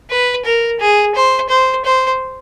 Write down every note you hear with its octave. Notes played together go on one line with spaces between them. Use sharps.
B4
A#4
G#4
C5
C5
C5